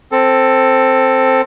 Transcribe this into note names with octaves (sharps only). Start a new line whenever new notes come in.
C4 A4